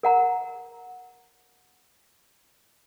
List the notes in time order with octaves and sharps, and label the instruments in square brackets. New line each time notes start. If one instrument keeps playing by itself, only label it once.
[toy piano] A#4 F#5 A#5